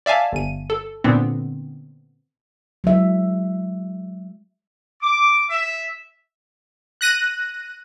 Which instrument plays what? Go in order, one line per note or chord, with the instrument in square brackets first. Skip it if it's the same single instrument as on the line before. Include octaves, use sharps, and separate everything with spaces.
[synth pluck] D5 E5 F5 G#5 A5
G1 D#7
A4
A#2 D3 B3 C4
[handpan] F#3 G#3 E5
[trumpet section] D6
E5
[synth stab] F#6 A#6 D#7